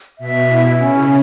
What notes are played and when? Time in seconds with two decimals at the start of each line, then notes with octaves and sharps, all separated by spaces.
0.18 B2 E5
0.50 E4
0.80 C#3 C#4